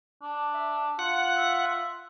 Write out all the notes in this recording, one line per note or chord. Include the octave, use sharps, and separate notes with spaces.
D4
E5
F4 F#5
E5